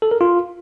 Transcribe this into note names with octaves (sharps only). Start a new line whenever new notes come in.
A4
A#4
F4